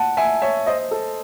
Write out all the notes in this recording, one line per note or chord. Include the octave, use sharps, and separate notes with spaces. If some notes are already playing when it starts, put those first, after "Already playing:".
Already playing: F#5 A5
E5 G#5
C#5 E5
C5 D#5
A4